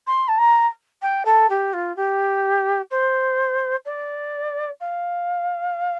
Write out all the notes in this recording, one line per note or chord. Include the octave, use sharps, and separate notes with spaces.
C6
A5
A#5
G5
A4
G4
F4
G4
C5
D5
F5